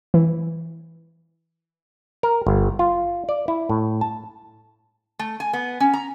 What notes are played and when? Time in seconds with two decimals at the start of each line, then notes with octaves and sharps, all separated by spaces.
0.14 E3
2.23 A#4
2.47 G1
2.79 F4
3.29 D5
3.48 E4
3.70 A2
4.01 A5
5.19 A3
5.40 G#5
5.53 B3
5.80 C#4
5.93 A#5